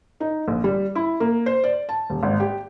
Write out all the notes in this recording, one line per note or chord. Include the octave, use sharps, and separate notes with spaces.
D#4
A#1
G3
E4
A#3
C5
D5
A5
D#1
G#1
G4